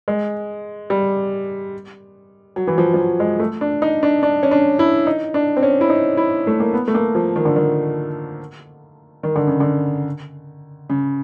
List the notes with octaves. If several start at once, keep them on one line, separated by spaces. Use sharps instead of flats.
G#3
G3
F#3
E3
F3
F3
F#3
G#3
A3
D4
D#4
D4
D4
C#4
D4
E4
D#4
D4
C4
C#4
E4
D#4
E4
A3
A#3
B3
A3
A#3
F3
D#3
D3
D#3
D#3
D3
C#3
D3
C#3